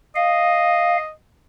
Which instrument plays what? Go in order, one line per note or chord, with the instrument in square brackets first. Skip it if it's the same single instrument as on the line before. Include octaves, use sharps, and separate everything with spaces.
[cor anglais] D#5 [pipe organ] F5